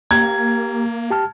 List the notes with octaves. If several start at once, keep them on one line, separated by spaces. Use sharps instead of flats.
A#3 G4 A#5 G#6
G4 A5 F6